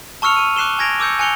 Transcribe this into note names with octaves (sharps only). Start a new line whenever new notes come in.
A5 C#6 E6 F6 C#7 F7
C#6 D#7
D6 F#6 C7 E7 G7
G#5 G#6 A#6 D7 F7
D6 E6 G6 C#7
G#5 F#6 C#7 F7 G7